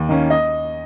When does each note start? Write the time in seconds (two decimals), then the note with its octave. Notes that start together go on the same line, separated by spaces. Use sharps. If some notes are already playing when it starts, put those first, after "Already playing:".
Already playing: D#2
0.09 D#3 A#3 C#4
0.30 D#5